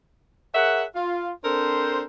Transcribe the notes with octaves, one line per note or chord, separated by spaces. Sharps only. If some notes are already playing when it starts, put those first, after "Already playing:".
G#4 A#4 C#5 E5 F#5
F4
C4 D4 A4 A#4 C5